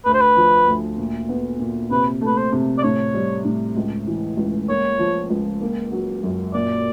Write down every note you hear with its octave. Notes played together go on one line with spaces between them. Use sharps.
D2 B4
C5
B4
F3
D2
A#2
B3
A#2
C3 B4
A3
B4
C5
C3
D5
A2 C#5
G3
A2
C#2
E3
C#2
A#3 C#5
F3
C#2
A#3
F#3
F#2
A#2 D5